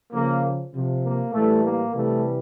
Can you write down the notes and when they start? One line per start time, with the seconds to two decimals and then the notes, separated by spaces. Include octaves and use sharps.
0.13 C#3 F3 A#3
0.73 C3 F3
1.02 A#3
1.33 A2 E3 G3 A3
1.63 A#3
1.93 C3 E3 G3 A3